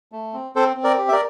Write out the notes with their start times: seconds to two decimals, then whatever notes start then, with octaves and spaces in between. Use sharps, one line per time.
0.12 A3
0.33 C4
0.55 C4 A4 C5
0.77 C4
0.84 A#4 D5
0.98 G4
1.08 E5
1.12 A#4 D5